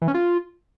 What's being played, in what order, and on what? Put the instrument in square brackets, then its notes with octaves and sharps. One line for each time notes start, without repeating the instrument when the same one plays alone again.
[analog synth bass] E3
C#4
F4